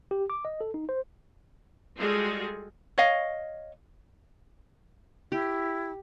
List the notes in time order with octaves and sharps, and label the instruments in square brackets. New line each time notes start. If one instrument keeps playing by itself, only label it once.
[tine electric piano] G4
D6
D#5
A4
D#4
C5
[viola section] G3 G#3 F4 F#4 G#4 A4
[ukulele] C#5 D#5 F5
[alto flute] E4 [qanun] G4